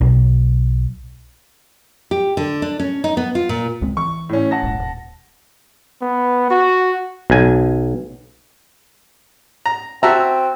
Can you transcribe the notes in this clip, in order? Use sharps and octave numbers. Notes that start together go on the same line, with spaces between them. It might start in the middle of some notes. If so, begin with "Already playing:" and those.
B1
G4
D3
D4
C#4
D#4
B3
F4
A#2
C#2 G#3 C4
E3 C#6
A2 C#4
F#5 A5 A#6
D1 A#1 G#2
D#1
B3
F#4
B1 G#5
A#5
C4 F#4 E5 A5 A#5